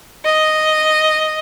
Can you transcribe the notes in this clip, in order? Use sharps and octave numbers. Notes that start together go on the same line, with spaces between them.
D#5